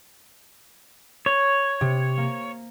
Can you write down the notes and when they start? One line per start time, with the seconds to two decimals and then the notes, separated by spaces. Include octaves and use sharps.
1.26 C#5 G6
1.81 C3
2.18 A#3